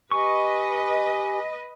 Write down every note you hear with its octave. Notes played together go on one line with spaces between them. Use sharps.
G4 B4 D#5 G#5 C#6